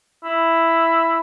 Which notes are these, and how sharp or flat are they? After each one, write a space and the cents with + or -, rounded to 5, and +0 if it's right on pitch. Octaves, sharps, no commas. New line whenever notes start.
E4 +5